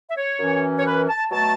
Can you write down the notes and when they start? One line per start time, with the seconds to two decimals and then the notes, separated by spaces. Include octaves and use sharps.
0.10 E5
0.17 C#5
0.39 F#2 E3 C#4
0.78 C#5
0.85 B4
1.08 A5
1.31 B2 F#3 A3 A5